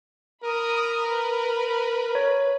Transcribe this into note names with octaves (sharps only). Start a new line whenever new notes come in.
A#4 B5 D#6 A#6
B4 B5
C#5